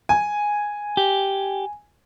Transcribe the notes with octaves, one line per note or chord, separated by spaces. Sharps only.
G#5
G4